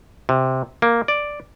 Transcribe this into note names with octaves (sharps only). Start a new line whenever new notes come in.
C3
A#3
D5